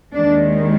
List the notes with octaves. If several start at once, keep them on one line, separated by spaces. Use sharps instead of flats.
D#2 D#3 G#3 D4